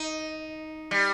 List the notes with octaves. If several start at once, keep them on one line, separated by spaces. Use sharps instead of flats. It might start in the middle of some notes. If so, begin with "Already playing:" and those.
Already playing: D#4
G3